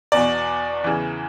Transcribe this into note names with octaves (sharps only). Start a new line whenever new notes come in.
E2 B2 D5
E2 C#3 E3